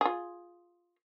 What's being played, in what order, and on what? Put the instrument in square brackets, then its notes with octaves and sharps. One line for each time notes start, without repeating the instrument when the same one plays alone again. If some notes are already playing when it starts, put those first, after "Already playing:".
[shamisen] F4 G#4